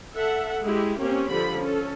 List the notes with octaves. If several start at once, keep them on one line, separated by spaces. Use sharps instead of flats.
A4 E5 F#5
G#3 E4 G4
A#3 C4 C#4 G4
D3 F3 G3 B5
C#4 A4